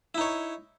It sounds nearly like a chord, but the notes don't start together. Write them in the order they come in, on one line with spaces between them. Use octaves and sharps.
E4 D#4 C#5